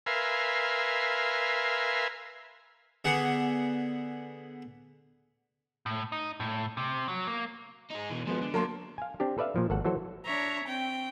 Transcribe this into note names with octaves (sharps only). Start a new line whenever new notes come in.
A#4 B4 E5 F5 G#5 C6
D3 B3 G#4 F#5
A2
D#4
A2
C3
F#3
A#3
D#4 G#4
B2 E3
F3 F#3 G#3 B3
D3
F#3 A#3 A#4 A5 C6
F5 G#5
C4 D4 G4
A4 B4 D5 E5 F5
A#2 F3
G#1 A4 F#5
E3 F#3 F#4 A4 C5
D4 C#5 E5 A#5
C4 G5